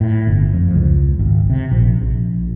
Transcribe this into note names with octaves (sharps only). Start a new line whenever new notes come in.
A2
G1
F2
C#2
G#1
C3
A#1
A#1